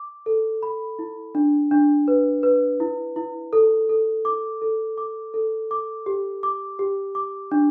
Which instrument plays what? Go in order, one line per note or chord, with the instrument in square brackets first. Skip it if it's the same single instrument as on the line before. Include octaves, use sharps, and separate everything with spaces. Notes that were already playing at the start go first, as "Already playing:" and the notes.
Already playing: [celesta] D6
A4
B5
E4
D4
D4
B4
B4
E4
E4
A4
A4
D6
A4
D6
A4
D6
G4
D6
G4
D6
D4